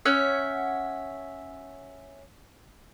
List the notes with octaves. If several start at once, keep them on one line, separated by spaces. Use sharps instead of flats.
C#4 C#5 E5 F#5